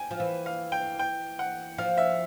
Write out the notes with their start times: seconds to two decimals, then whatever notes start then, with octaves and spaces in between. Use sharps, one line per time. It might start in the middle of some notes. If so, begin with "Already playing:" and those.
Already playing: G5 G#5
0.11 F3
0.20 E3
0.46 F5
0.72 G5
0.99 G5
1.39 F#5
1.78 F3 F5
1.97 E5